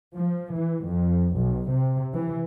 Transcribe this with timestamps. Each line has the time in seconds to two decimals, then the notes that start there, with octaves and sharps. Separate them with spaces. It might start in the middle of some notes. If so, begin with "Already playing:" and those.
0.16 F3
0.54 E3
0.86 F2
1.34 B1
1.70 C3
2.14 E3